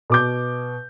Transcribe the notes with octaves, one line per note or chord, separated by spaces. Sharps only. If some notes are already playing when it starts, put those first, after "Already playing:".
B2 D6 G6